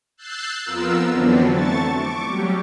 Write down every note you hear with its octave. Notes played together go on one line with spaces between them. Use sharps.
E6 F#6 G6 A6 C7
F2 B3 F4 A#4 E6
D3 E3 F#3 B3 C4 D4
A3 A5 C#6 A6
C#6 D6
F#3 G3 G4